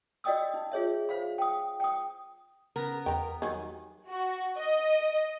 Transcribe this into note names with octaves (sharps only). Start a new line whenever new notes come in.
F#4 D5 D#5 G5 D#6 E6
D#4
F4 G#4 C#5 E5
C5 F5 B5
G5 D#6
G5 D#6
C#3 B3 A#4
E2 G5 A#5
D#3 F#3 G3 G#5
F#4
D#5